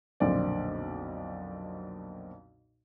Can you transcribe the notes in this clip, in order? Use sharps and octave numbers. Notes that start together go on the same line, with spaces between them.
B1 F2 A#2 D3 C4 D5